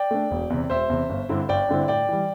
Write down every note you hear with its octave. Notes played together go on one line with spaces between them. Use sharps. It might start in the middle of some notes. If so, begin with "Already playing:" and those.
Already playing: D5 G5
A3 D4
E1
E2 C3
E1 C5 E5
E2 C3
G1
G2 D3 C4 E4
G1 D5 G5
G2 D3 C4 E4
A2 D5 G5
E3 G3